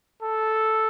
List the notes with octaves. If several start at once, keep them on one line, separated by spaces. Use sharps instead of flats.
A4